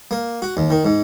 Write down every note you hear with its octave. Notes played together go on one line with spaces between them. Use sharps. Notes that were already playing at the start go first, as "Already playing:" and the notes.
A#3
F#4
D#2
D#3
G#2